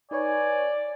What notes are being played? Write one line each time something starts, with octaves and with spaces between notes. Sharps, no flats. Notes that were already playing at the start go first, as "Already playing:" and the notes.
D#4 B4 C#5 D5 G#5